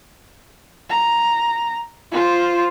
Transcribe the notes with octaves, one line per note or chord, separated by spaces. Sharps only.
A#5
F4 C5